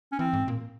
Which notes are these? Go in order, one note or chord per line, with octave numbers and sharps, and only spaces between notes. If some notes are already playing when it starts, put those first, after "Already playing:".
C#4
E3 C4
G#2
A#2